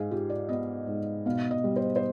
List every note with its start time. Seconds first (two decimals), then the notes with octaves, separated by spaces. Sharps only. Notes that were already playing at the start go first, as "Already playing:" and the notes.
Already playing: G#2 G#4 F5
0.11 F4 G4
0.30 D5
0.49 B3 D#5
0.87 G#2
1.26 B2 F5
1.51 D#5
1.64 G3
1.76 C5
1.96 C5